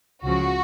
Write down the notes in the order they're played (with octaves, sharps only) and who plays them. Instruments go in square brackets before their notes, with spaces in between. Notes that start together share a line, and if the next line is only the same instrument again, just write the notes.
[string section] C#2 C#3 F3 F#4